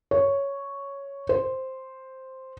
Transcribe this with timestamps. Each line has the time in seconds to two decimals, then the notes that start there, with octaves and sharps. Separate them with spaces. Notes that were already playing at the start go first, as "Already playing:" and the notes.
0.11 C#5
1.29 C5